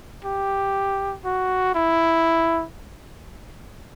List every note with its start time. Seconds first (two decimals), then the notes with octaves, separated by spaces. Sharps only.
0.25 G4
1.25 F#4
1.74 E4